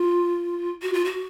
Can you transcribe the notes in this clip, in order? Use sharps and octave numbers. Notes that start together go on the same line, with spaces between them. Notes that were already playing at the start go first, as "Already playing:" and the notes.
Already playing: F4
F#4
F4
F#4